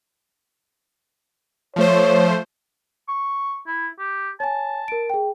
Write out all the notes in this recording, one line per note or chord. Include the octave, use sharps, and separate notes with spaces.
F3 A3 C5 C#5
C#6
E4
G4
C#5 G#5 A5
A#4 D7
G#4 G5